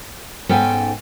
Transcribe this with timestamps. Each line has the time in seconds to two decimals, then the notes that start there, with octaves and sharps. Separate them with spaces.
0.49 G#2 B3 C#4 A4 G5 G#5